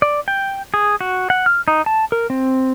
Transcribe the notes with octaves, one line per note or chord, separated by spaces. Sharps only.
D5
G5
G#4
F#4
F#5
F6
D#4
A5
A#4
C4